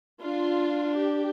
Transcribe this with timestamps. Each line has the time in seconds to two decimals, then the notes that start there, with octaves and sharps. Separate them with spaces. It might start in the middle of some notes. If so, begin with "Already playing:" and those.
0.22 D4 F4
0.97 G4